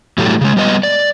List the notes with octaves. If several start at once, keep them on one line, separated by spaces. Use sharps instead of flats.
A2 E3 F#3 G3 A3
C#3 G#3
G3 B3 D#5
D5